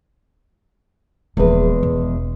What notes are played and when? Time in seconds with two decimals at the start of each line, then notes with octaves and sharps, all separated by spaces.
1.37 D#1 E2 F3 G#3 B4
1.83 E1